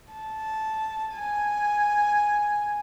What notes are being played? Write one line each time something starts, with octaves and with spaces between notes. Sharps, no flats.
A5
G#5